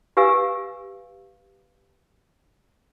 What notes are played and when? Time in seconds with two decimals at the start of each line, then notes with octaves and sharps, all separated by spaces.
0.17 G4 B4 F5 G#5 E6